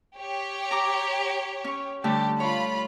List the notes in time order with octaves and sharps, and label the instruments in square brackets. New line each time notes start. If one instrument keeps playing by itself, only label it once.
[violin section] G4 C#5
[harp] A#5 D6
C#4 C#6
[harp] D3 G3 A3 [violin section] G4
[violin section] F4 B5 [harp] C#5